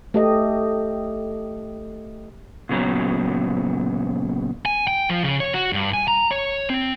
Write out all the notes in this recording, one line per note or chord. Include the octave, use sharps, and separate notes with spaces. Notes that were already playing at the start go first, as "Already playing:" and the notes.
A3 G4 D#5
A#2 C#3 F#3 B3 C#5 A#5
G#5
G5
F3
C#3
C#5
F#4
G2
G#5
A#5
C#5
C4